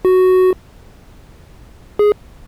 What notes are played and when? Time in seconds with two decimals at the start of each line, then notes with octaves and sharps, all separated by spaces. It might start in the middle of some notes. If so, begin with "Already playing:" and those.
0.05 F#4
1.99 G#4